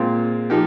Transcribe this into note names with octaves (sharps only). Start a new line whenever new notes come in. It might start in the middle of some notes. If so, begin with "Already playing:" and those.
Already playing: A#2 G#3 C4 F4
F3 A#3 D#4 G4